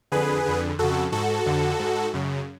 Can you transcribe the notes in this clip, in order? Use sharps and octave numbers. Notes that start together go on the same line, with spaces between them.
F2 D3 G#4 B4
F2 D3
F2 C#3 F#4 A4
G#2 F#4 A4
F2 D3
G#2
F#2 C#3